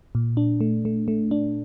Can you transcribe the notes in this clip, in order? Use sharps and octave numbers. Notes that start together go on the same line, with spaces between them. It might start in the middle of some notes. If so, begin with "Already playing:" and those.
A#2
D4
A3
A3
A3
D4